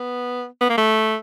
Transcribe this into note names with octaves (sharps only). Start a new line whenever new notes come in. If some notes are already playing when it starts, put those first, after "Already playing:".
Already playing: B3
B3
A#3
A3